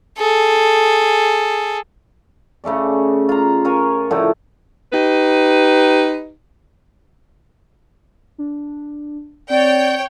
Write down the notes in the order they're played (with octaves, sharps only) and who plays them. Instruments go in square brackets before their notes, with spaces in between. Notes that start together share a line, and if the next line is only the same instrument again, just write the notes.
[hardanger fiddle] G#4 A4
[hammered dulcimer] C#3 A3 C#4 D5
F4 A#5
F4 A#4 C#5 G#5
A2 D3 F3 A3
[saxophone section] D#4 G4 B4
[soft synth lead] D4
[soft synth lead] C4 [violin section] C#5 G5 [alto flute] D5